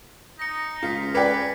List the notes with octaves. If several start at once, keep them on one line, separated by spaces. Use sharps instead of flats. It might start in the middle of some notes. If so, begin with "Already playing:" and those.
D#4 A#6 C#7
C#2 F4 B6 C#7
B4 D5 G5 G#5 D6 B6 C#7